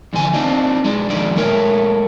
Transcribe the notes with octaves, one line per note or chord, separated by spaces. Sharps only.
E2 D3 F3 G#5
C4 D4 D#4 F4
G#3 D4
F2 D#3 G#3 D#4 D5
G#3 A3 A#4 C#5